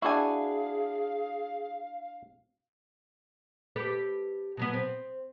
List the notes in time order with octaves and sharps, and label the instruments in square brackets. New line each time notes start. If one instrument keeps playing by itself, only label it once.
[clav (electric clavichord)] D4 E4 [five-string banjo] F#4 G#5 [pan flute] G#4 [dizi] F5
[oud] G4 A4 B4
B2 F#3 B3
C4